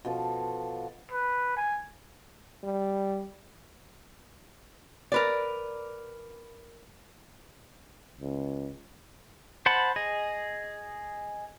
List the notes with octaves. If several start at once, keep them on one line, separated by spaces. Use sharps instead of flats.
B2 F3 A4
B4
G#5
G3
A#4 B4 D5
C#2
C5 F#5 A5 B5
G#4 D#5